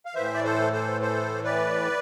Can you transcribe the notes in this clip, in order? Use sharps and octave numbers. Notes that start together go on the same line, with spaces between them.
F5
A2 E3 C5 E5
D5
A4 C5
A4 C5
A4 C5
B4 D5